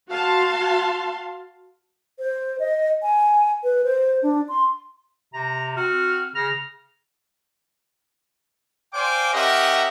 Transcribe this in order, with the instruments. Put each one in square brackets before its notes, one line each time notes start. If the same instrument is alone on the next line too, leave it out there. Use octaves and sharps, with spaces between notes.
[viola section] F#4 F5 A5 C6
[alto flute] C5
D#5
G#5
B4
C5
D4
C6
[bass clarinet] C3 [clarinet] A#5
[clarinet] C4 [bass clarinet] F#4 [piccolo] F6
[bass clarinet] C#3 [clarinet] F6 [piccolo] A#6
[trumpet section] C5 D5 F5 G5 G#5 D6
C#4 G4 A#4 D#5 E5 F#5